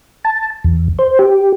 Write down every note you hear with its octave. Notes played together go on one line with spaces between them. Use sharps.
A5
E2
C5
G4